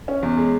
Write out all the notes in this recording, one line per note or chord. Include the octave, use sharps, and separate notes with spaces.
C#4
E2
G#3